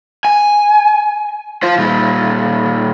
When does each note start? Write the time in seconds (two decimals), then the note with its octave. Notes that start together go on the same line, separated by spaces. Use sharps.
0.25 G#5
1.63 F4 C5
1.78 A#2 G3